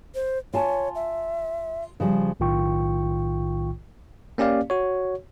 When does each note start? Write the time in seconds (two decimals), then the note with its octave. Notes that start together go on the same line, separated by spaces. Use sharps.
0.15 C5
0.54 F4 C#5 G#5 A5
0.95 E5
2.00 C#3 F3 G3
2.40 B1 A2 D#3 F4 G5 C#6
4.38 A#3 C#4 G4 D5 F5
4.70 F#4 C#5